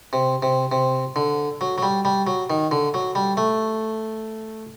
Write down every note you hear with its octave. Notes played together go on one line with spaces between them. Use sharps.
C3
C3
C3
D3
F#3
F#3
G3
G3
F#3
D#3
D3
F#3
G3
A3